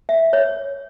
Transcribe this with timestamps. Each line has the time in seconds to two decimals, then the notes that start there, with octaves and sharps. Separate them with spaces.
0.09 E5
0.33 C#5